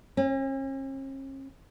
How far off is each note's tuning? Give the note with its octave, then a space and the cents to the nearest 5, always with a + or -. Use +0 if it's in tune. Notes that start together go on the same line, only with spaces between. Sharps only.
C#4 -45